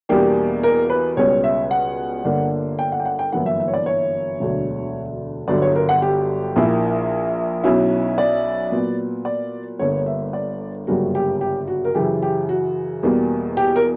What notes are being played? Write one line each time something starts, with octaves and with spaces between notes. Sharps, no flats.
E2 B2 G3 A#3 D4 G4
A#4
B4
C#2 B2 G3 C#4 C#5
E5
F#5
G1 G2 D3 A#3 D4
G5
F#5
G5
F#5
G5
G1 F#2 E3 A#3 E4 F#5
E5
E5
C#5
D5
C#5
E1 D2 D3 F#3
G1 G2 D3 F#3 D5
C#5
A#4
F#5
G4
A#1 A#2 A#3 E4
B1 B2 F#3 C#4 E4
D5
A#2 F#3 B3
D5
G1 G2 D3 A#3 C#5
E5
D5
G1 F#2 C#3 G3 A#3 F#4
G4
G4
F#4
A#4
F#2 C#3 E3 G4
G4
F#4
E2 B2 G3 A#3
G4
A#4